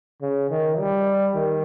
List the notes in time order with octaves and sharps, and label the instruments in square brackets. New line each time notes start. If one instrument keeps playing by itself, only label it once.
[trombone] C#3
D#3
G3
D#3